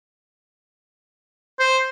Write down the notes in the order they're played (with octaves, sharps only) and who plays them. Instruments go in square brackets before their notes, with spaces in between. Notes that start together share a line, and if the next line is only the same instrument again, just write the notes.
[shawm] C5